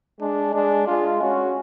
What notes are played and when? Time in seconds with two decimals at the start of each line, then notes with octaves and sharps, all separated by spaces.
0.20 G#3 D4
0.54 G#3 D4
0.87 G#3 F4
1.21 C#4 F#4